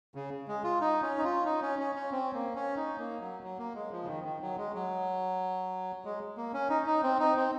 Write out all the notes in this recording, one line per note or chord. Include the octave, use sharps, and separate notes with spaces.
C#3
G#3
F4
D#4
C#4
D#4
F4
D#4
C#4
C#4
C#4
C4
A#3
C#4
D#4
A#3
F#3
F#3
A#3
G#3
F3
C#3
D#3
D#3
F#3
G#3
F#3
G#3
A#3
C#4
D#4
D#4
C4
D#4
C4